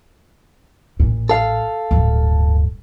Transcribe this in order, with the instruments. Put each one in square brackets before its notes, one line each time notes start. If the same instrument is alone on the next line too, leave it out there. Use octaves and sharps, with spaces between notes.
[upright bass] A1 A#2
[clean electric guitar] A4 F5
[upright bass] D1 G2